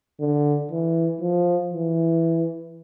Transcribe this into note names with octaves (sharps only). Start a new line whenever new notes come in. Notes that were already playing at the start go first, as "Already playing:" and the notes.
D3
E3
F3
E3